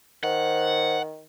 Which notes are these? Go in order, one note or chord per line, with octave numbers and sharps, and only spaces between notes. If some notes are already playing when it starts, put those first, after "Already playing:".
D#3 C5 F#5